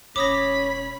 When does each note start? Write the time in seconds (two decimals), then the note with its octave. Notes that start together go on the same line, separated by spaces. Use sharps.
0.16 E1 C#4 C#5 B5 D6 D#6 A#6